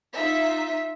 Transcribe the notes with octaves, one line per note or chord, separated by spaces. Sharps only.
D#4 F4 E5 B6